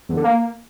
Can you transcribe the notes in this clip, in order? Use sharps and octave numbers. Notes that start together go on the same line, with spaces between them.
E2
D3
A#3